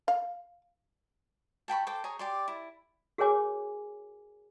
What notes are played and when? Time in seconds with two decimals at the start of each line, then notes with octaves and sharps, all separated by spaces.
0.08 F5
1.68 A4 G5 B5 C#6
1.87 A4 C5 G5 D6
2.04 G#4 C#5 A#5
2.19 G4 D5 C6
2.48 E4
3.18 F#4 G#4 A#4 C#5 G#5 D6